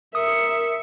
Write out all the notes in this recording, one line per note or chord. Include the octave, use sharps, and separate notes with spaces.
A#4 E5 D#6 C#7